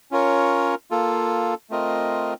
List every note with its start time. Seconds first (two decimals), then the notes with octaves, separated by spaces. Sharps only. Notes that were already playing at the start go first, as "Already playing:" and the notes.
0.11 C#4 F4 A#4 C#5
0.91 A#3 F4 A4
1.70 A3 C4 F4 A#4 D#5